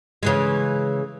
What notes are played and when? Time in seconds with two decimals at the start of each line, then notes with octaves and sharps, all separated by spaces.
0.23 C#3 E3 G#3